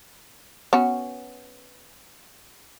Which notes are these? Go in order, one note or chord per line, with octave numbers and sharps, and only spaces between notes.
B3 C#4 F#4